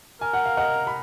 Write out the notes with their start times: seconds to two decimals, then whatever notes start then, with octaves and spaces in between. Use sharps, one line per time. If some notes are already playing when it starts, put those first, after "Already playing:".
0.21 A#4 G#5
0.33 F#5
0.46 F5
0.57 D#5 F#5
0.87 B5